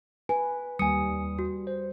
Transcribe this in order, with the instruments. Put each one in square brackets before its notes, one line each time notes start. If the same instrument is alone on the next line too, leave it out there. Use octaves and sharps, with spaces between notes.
[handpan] B4 [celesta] G#5
[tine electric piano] D#2 D#6 [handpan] G3 [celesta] G#5 C#7
[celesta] F#4
[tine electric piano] C5